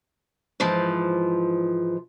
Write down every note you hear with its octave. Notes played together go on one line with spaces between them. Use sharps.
G#2 E3 F3